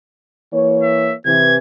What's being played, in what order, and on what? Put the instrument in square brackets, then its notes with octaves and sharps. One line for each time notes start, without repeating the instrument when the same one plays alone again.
[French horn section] E3 A#3 C#5
[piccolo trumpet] E5
[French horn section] C3 E3 [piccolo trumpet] G#6